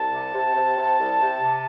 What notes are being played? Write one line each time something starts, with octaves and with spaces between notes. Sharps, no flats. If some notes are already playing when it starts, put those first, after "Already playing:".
Already playing: C2 A5
C3
C3
C3
C3
C2
C3
C3